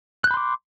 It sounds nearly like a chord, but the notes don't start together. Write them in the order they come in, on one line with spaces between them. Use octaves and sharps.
F#6 G6 B5 C6 D6